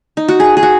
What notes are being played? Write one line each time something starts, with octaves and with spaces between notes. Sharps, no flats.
D#4
F#4
G#4
G#4
F#4